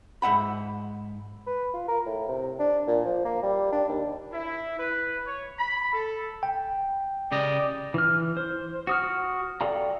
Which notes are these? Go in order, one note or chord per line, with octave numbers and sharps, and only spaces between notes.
G#2 E5 F#5 B5
B4
F4
A#4
A2
C3
D4
A#2
F3
A#3
G3
D4
D#2
E4
B4
C#5
B5
A4
G5
C#3 G4 D5 D#5
E3 F6
C5
F#4 D#6 F6
A4 D5 F5 G5 A#5